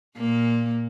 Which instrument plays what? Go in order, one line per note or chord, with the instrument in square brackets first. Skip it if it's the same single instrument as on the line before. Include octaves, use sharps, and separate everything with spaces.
[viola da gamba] A#2 A#3